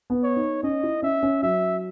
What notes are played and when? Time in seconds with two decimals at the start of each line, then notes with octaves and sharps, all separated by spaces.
0.10 B3
0.23 C#5
0.36 D#4
0.63 C#4 D#5
0.83 E4
1.02 C#4 E5
1.23 C#4
1.43 F#3 E5